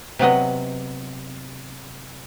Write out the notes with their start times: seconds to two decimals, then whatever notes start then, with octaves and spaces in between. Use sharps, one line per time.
0.19 C3 F#3 B3 D#5